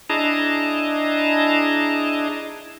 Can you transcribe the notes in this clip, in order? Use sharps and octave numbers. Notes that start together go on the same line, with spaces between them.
D4 E4 G#4 D#5 A5 A#5